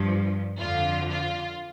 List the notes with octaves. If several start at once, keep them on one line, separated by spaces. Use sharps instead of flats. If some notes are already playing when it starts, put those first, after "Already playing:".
Already playing: G2 F3
F2 D3 F3 F4
F4